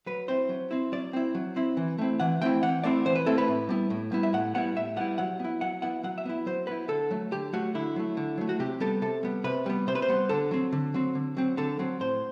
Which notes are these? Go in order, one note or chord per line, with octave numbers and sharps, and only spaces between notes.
F#3 B4
C4 E4 C5
F#3
C4 E4
F#3 D5
C4 E4
F#3
C4 E4
E3
A3 C4 E4
E3 F#5
A3 C4 E4 G5
E3 F#5
A3 C4 E4 D5
E3 C5
B4
A3 C4 E4 A4
B4
A2
G3 B3 E4
A2
G3 B3 E4
E5
A2 F#5
G3 B3 E4 F#5
A2 E5
G3 B3 E4 F#5
F#3 F#5
B3 E4
F#3 F#5
B3 E4 F#5
F#3 F#5
E5
B3 E4
F#3 C5
B3 E4 B4
D3 A4
F#3 A3
D3 G4
F#3 A3 F#4
D3 E4
F#3 A3
D3
F#3 A3
F#4
C3 G4
G3 B3 A4
C3 A4
G3 B3
C3 B4
G3 B3
C3 C5
B4
C5
G3 B3
D3 A4
F#3 C4
D3
F#3 C4
D3
F#3 C4
D3 A4
F#3 C4
A2 C5